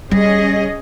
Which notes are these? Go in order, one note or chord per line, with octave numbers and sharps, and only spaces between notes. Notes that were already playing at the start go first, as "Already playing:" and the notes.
G3 C#4 G#4 D#5